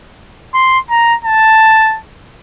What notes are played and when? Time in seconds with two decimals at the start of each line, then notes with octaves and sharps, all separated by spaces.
0.54 C6
0.90 A#5
1.25 A5